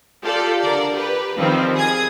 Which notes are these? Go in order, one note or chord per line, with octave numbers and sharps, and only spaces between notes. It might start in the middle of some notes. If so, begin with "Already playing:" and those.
F4 G4 A4 D5
D3 A#4 D5
G4 B4
D#3 F3 G3 C4
G#4 D#6 G#6